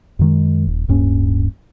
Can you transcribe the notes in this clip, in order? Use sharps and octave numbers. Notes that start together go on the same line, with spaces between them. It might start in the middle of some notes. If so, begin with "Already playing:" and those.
F#2 D#3 G#3
D#1
D1 G2 A#3 C#4